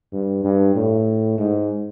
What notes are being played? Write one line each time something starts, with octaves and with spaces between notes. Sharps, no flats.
G2
G2
A2
G#2